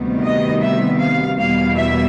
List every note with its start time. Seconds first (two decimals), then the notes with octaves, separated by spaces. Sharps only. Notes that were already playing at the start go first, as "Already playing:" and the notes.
Already playing: D2 C3 D#3 G3 B3
0.23 D#5
0.62 E5
0.99 F5
1.37 E2 B2 G3 A#3 F5
1.76 E5